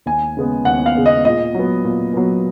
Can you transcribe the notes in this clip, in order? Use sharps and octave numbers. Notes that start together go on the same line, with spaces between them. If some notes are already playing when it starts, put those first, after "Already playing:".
D#2 G#5
C#3 G#3 B3
D#2 F#5
F5
C#3 G#3 B3
D#5
A#2 D#5
F#3 B3
A#2
F#3 B3